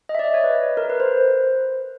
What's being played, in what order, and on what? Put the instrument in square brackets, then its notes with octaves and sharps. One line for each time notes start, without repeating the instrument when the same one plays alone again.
[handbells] D#5
E5
D5
D#5
C#5
B4
A#4
B4
C5